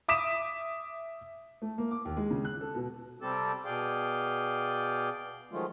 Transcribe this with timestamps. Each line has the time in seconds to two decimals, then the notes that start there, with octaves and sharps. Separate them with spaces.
0.08 E5 D6 D#6 B6 E7
1.62 A3
1.78 A#3
1.91 D6
2.05 D#2
2.17 G#3
2.31 C#3
2.45 F#6
2.61 A4
2.75 B2
3.21 C3 G3 C4 G4 A4 A5
3.65 B2 G#4 D5 F5 G5
5.52 D#3 F3 F#3 G#3 A3 F4